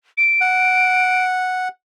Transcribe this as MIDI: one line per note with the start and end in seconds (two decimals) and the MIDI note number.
0.18 1.25 98
0.41 1.68 78